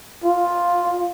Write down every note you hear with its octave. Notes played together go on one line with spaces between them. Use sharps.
F4